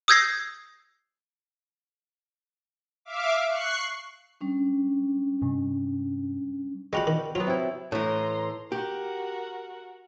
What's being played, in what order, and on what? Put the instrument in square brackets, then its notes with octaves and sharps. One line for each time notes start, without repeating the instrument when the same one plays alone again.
[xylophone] D#6 E6 G6 G#6 A#6 C7
[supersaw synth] E5 F5 D6
C#6 F#6 C7
[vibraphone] G3 C#4 D4
[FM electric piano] G2 C3
[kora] G3 F#4 [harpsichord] G#3 F4 F#5
[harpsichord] D#3
[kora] F#3 B3 [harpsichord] F4
[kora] C3 E4
[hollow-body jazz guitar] A2 E3 [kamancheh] A#5 C6
[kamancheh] F#4 A#4 [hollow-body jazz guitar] G4